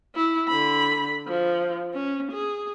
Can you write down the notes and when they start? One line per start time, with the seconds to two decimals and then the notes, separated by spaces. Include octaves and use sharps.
0.15 E4
0.48 D3 B5
1.27 F3
1.93 C#4
2.31 G#4